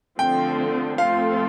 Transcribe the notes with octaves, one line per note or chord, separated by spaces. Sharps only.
D3 F3 A3 C4 G5
F3 A3 C4 F4 A4 F5